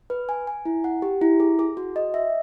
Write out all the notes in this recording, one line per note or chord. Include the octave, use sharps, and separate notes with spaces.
B4
G#5
G#5
E4
F#5
G4
E4
G#4
G#4
F#4
D#5
E5